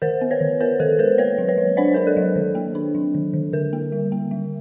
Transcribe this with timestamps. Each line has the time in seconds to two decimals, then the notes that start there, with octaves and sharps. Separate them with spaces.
0.02 D#3 A#4 C5
0.21 B3
0.31 B4 C#5
0.41 D#3
0.60 B3 A#4 C5
0.80 D#3 A4 B4
0.99 G#3 A#4 C5
1.18 A#3 B4 C#5
1.38 F#3
1.48 B4 C#5
1.58 F#3
1.77 D4 C5 D5
1.94 D4 A#4
2.07 A4
2.17 F#3
2.36 D#3
2.55 A#3
2.75 D4
2.95 F#3
3.14 D#3
3.33 D#3
3.53 D3 A#4
3.73 A#3
3.92 G3
4.12 A#3
4.31 G3